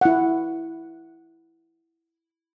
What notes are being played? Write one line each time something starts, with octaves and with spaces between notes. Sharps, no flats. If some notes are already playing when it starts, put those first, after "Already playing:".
E4 F#5